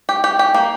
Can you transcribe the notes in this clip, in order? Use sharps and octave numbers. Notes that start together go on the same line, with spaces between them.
G4
G4
G4
A#3